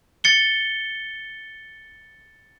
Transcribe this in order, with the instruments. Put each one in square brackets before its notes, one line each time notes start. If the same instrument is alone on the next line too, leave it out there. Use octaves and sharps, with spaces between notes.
[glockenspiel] A6 C#7 G7